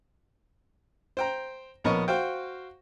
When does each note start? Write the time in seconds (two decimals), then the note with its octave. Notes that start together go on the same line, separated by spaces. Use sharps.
1.17 C5 G5 A#5
1.84 A#1 B3 A#4 C#5 D#5 C#6
2.08 F#4 C5 F5 G5